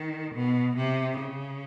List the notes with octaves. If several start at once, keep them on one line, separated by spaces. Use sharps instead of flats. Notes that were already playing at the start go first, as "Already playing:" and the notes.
Already playing: D#3
B2
C3
C#3